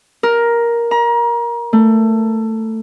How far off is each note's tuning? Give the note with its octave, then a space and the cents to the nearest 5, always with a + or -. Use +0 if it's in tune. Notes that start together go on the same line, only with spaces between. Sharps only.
A#4 +10
A#5 +30
A3 +15